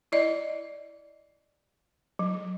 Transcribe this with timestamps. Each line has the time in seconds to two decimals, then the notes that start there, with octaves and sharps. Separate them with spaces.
0.12 E4 D5 D#5
2.19 F#3